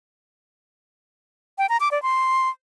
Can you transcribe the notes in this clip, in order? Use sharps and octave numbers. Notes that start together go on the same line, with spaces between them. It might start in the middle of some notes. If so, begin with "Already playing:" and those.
G5
A#5
D6
D5
C6